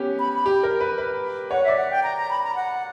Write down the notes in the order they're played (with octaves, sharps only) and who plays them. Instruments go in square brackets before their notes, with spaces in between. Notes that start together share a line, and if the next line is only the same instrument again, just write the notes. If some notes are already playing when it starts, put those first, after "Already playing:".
Already playing: [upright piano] B3 C#4 G4
[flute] B5
B5
[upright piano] G4
A#4
B4
B4
[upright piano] C#5 [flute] F#5
[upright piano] D5 [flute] E5
[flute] F#5
G5
A#5
A#5
B5
A#5
F#5